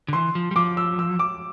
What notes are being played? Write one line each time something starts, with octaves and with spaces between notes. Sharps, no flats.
D3
E3 C6
F3
G3
F3 D6
E6
E6
D6